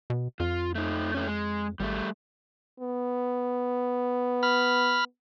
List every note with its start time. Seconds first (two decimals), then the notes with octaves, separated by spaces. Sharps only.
0.10 B2
0.40 F2 F4
0.75 A3 D#4
1.15 D3 A3 C#4
1.27 G#3
1.80 G#1 G3 A3
2.80 B3
4.43 B5 F6